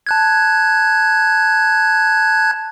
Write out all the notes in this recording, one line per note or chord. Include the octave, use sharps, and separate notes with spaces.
A5 F#6 G#6